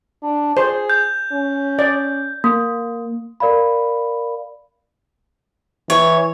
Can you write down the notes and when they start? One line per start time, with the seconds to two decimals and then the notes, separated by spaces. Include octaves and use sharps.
0.22 D4
0.57 G#4 C5
0.90 G6
1.32 C#4
1.79 D5
2.44 A#3
3.40 A#4 D5 F5 B5
5.90 E3 C#5